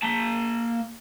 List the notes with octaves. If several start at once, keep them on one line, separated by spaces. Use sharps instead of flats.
A#3 A5